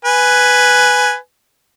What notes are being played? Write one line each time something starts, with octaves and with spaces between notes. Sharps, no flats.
B4 G#5